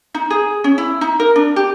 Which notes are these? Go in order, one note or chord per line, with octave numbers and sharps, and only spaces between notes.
D#4
G#4
C#4
E4
D#4
A#4
D4
G4